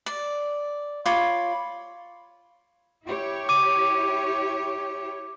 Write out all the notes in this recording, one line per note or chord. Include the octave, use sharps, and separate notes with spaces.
D5
F4 C#5 B5 D6
E4 G4 C#5
D6 D#7